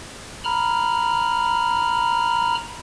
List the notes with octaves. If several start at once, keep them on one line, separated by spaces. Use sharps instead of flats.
A#5 B5 F6